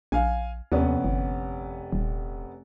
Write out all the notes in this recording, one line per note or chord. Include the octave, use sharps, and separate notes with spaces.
A#1 F5 G#5
F1 D#2 B3 C#4
G1
D#1